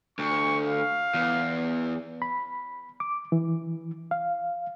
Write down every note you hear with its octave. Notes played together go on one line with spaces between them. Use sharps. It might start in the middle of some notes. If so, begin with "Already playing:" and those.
D2 C#6
F5
E2
B5
D6
E3
F5